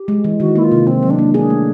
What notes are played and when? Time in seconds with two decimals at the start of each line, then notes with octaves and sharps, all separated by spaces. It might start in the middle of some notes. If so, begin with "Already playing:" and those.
Already playing: G4
0.08 G#3
0.24 E3
0.40 D#3 F#4
0.56 A#3 E4
0.64 F4
0.72 C3
0.87 C3 C4
1.03 F#3
1.10 D4
1.19 A#3
1.34 D4 G#4
1.50 A3